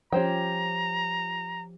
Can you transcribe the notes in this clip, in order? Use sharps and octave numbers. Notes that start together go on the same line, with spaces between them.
F3 C#4 G4 C5 G5 A#5